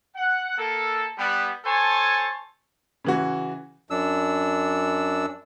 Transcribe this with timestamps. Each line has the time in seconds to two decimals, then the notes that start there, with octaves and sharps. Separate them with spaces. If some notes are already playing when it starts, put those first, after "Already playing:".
0.16 F#5
0.57 A#3 A4
1.18 G3 B3
1.66 A4 C5 C#5 G#5 A5
3.04 C#3 E3 F#4
3.90 F#2 D4 E6